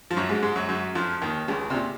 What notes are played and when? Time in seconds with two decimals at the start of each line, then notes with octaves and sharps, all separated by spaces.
0.11 F3
0.16 F#2 F#3
0.29 G#2 G#3
0.43 G#2 G#3
0.55 F#2 F#3
0.68 F#2 F#3
0.95 F2 F3
1.22 D#2 D#3
1.48 C#2 C#3
1.70 C3
1.74 A#2